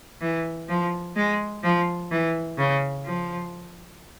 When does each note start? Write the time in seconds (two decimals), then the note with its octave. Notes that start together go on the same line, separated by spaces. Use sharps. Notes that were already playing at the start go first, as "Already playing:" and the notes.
0.21 E3
0.69 F3
1.16 G#3
1.63 F3
2.11 E3
2.58 C#3
3.05 F3